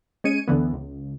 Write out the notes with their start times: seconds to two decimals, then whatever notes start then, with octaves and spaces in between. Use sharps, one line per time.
0.24 G#3 C#4 G#6 C#7 D#7
0.48 D2 D3 E3 B3
0.73 C#2